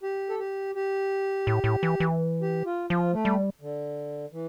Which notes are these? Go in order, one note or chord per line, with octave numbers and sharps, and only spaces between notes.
G4
A4
G4
G4
A2
A2
E3
E3
G4
F4
F3 F4
A3
G3
D3
E3